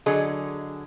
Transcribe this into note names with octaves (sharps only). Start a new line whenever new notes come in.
D3 F#3 G#4 D#5